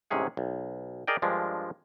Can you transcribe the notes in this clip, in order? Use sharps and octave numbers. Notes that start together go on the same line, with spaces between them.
A1 G#2 C3 C#4 G#4 F#5
B1
G#4 A#4 D5 D#5 G5
G2 F3 G#3 D4 A#4